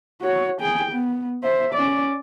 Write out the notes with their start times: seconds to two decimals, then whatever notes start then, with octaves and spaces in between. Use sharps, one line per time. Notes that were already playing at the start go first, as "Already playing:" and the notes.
0.21 F#4 C#5
0.61 G#4 G5
0.92 B3
1.43 C5 E5
1.74 C#4 D5